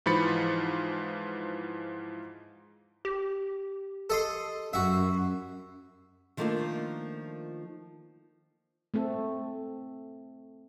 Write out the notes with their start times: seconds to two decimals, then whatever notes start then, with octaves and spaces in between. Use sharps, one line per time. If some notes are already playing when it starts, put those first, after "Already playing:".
0.06 G#2 E3 F3 B5 A6 C#7
3.05 G4
4.10 A4 D#5 C6
4.73 F#2 F#4 E5
6.37 D#3 F3 A3 A#3 D4 F4
8.94 A3 C4 A4